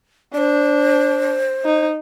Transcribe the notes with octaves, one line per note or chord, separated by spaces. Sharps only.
D4 C5 D5
D#4